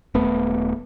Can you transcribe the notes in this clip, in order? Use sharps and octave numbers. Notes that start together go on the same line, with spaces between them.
D#1 A3 B3